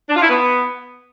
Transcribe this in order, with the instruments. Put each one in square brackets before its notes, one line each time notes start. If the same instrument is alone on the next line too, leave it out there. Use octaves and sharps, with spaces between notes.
[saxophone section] D4
F4
E4
B3